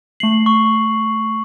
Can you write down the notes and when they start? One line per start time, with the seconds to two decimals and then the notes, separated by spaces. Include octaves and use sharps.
0.20 A3 C7 F#7
0.46 C#6